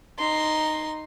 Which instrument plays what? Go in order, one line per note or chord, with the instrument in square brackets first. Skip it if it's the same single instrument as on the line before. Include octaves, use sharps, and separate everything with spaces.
[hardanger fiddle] D#4 C6